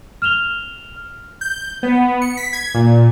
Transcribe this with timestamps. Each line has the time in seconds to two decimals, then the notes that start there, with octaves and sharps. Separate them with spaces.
0.22 F6 E7 F7 G7
1.41 G6
1.83 B3
2.21 C#7
2.37 B6
2.53 G#6
2.74 A#2